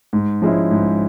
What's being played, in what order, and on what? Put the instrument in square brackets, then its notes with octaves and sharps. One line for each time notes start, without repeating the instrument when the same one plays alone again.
[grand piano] G#2
F3 G#3 C#4 E4
G#2